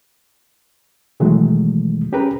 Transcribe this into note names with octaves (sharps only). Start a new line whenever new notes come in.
B2 D#3 E3 F#3 G#3 A3
C#4 G4 G#4 A#4 B4 A#5